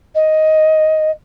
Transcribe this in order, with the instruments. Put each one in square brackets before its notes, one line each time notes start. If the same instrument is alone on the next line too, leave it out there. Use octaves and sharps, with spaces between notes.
[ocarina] D#5